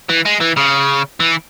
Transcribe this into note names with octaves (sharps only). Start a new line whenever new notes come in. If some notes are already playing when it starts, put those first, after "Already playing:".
E3
G#3
E3
C#3
E3